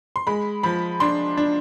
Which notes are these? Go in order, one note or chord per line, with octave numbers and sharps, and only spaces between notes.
C6
G#3 B5
F3 B5
D4 C6
D4